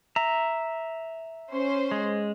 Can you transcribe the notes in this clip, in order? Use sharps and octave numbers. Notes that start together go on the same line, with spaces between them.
E5 A#5
C#4 C5
G#3